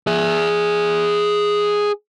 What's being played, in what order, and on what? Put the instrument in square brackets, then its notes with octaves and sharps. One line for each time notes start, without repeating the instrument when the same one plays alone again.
[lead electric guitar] G#4 E5